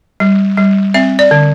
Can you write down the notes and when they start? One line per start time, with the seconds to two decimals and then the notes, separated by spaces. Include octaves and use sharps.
0.20 G3
0.57 G3
0.94 C4 E5
1.19 D5
1.31 D3